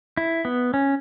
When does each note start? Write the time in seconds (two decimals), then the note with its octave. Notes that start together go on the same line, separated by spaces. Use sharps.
0.17 E4
0.45 B3
0.74 C#4